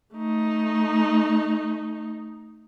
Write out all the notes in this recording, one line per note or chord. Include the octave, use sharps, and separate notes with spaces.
A3 D#4